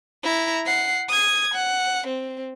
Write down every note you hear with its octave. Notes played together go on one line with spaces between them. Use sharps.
E4 A#5
F#5 C7
D#6 G#6
F#5
C4